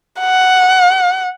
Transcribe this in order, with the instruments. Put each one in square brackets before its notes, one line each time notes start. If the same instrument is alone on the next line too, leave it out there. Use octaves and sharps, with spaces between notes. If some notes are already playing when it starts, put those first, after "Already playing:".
[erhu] F#5